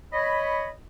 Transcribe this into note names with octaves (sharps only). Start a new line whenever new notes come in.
C#5 D#5 B5